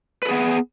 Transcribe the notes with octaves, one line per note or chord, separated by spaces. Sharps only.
B3 G#4 A4 B4